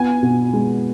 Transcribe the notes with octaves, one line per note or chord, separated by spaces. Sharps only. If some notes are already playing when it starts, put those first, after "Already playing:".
Already playing: B3 G#5
B2
G#3